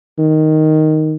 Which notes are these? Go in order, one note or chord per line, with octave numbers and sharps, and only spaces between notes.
D#3